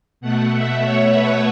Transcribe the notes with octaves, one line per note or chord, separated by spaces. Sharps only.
B2 A3 F#5
E5
C#5
B4